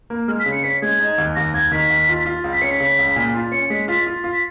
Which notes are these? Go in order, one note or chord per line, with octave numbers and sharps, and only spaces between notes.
A#3
G#3 F6
B6
C#3
C#7
C#4 B6
G#3 G#6
D#4
D#2
D#2 A#6
D#2 G#6
D#3 B6
D#2
F4
F4
C#2
B6
C#4 C#7
B6
C#3
C#2
A#2
F4
C#4 C#7
G#3 B6
F4 B6
F4
F4
B6